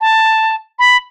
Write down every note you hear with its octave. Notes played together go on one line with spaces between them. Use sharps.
A5
B5